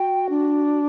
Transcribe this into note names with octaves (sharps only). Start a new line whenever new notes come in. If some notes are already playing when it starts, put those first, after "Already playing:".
Already playing: F#4 G5
D4